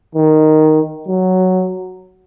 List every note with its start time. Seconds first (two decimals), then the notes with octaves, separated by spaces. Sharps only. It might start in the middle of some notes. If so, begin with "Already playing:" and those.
0.15 D#3
1.08 F#3